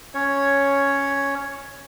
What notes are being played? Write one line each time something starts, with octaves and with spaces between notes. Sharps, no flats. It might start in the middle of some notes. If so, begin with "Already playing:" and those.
C#4 C#5